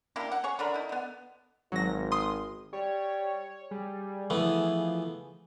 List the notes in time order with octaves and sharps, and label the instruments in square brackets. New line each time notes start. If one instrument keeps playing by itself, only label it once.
[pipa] A#3 D4 E4 G4
F#5
G#4 C#5 C#6
D3 D4 A#4 B5
D#4 E4
D3 B3
[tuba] G#1 [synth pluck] F#3 A#6
[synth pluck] C6 D#6
[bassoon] G3 [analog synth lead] C#5
[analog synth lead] G3 [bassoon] G#4
[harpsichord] E3 A3 B3 [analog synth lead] F3